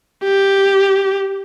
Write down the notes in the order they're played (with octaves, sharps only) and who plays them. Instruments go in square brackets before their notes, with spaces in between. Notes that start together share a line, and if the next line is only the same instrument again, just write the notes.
[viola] G4